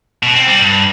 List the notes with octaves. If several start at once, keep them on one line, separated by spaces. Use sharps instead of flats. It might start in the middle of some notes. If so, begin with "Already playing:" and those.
B2
C4
G3
G2